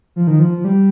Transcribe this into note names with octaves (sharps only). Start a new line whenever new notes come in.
F3
D#3
F3
F3
G3